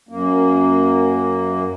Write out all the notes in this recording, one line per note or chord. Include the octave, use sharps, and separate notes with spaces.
F#2 A#3